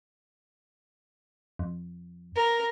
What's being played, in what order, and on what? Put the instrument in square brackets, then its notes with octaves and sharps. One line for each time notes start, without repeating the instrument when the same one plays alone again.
[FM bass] F2
[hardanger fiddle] A#4